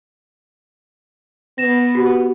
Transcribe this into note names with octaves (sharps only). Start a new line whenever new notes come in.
B3 A#6 E7
F#4 G4